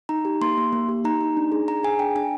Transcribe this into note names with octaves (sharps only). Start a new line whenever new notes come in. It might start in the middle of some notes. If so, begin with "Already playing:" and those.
D#4 A#5
G4
A#3 C6
A#3
A#3
G4
D#4 A#5
D#4
D4
G#4
D4 A#5
G#4 G#5
D4 G5
D4 G#5